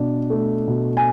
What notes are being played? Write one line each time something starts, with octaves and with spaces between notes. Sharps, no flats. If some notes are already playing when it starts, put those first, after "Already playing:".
Already playing: B2 D4
A3
B2
G#5